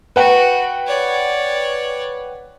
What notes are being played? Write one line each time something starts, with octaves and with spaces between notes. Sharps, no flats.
F#4 B4 F#5 G5
C#5 D5